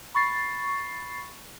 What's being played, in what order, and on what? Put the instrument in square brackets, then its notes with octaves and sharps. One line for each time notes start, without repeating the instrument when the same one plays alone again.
[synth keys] B5 C#6 A6 C7